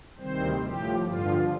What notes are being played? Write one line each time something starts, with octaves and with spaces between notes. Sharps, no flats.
D2 C3 D#3 G3 C4 C5
A2 F3 G4
G2 D3 F3 F4